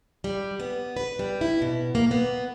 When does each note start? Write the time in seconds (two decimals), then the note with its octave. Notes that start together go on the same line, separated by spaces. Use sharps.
0.24 G3
0.60 B3
0.97 B4
1.19 G3
1.41 E4
1.62 B2
1.95 A#3
2.11 B3